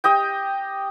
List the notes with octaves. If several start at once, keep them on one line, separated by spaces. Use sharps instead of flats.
G4 D#5 G5